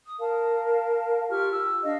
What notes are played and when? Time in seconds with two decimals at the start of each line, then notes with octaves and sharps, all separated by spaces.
0.05 D#6
0.20 A#4 F5 A5
1.30 F4 G4 C#6 F6
1.53 E6
1.83 D4 D#5 F5